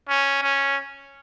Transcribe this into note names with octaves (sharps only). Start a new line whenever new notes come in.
C#4
C#4